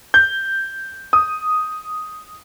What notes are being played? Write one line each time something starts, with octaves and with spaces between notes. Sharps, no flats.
G6
D#6